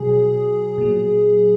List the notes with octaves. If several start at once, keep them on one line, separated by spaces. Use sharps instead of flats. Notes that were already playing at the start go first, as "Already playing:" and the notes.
Already playing: B2 F#3 G#4
A#2 F#3